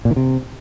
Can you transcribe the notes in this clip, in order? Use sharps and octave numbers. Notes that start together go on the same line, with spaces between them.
A#2
D#3
C3